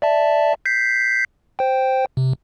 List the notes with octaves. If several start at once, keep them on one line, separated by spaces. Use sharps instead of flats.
D5 E5 A5
G6 B6 C7
C5 G5
C3